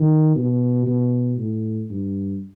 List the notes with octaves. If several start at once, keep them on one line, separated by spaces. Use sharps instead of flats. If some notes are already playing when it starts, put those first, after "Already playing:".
Already playing: D#3
B2
B2
A2
G2